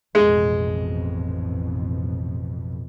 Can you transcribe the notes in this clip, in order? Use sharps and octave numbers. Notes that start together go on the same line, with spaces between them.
A1 F2 B2 G#3